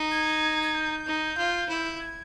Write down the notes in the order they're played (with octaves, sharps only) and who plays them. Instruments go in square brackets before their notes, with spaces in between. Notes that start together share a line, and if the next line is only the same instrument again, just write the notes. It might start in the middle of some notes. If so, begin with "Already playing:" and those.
Already playing: [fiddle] D#4
[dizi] G#6
G#6
G6
[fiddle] D#4
F4
E4
[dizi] G#6